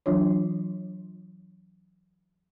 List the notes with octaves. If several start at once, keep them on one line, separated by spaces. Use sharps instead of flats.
E3 F#3 D4 F4 C#5